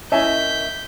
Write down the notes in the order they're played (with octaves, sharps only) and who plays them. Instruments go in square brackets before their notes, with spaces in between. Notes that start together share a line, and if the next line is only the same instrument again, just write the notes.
[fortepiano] C#4 E5 G#5 [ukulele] E4 A#4 D#5 [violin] G6 B6